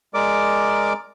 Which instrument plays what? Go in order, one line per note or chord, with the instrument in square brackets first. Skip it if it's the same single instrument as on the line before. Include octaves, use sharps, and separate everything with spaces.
[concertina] G#3 A#4 D5 D6